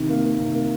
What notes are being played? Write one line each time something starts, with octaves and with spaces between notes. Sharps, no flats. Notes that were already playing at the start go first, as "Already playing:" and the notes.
Already playing: C3 D#3
A#3
A#3
C3
A#3